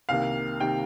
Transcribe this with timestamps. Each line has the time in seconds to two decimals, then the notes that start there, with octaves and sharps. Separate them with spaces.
0.09 C2 C3 D#3 A#3 F5
0.60 C3 D#3 A#3 G5